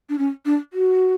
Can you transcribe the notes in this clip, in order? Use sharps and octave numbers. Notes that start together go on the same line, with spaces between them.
D4
C#4
D4
F#4